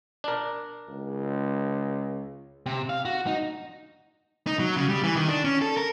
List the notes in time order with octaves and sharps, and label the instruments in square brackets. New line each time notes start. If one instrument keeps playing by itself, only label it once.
[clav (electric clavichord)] D4 A#4
[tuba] C#2
[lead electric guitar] C3
F5
F#4
D#4
D#4
F#3
C#3
G3
E3
D#3
D4
C#4
A4
A#4